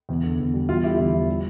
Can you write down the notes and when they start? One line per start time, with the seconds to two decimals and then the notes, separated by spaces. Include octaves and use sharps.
0.09 E2
0.23 D3
0.39 E2
0.54 G3
0.69 E2 F4
0.83 D3 E4 G4
0.98 E2 E4 G4
1.13 F3
1.29 G3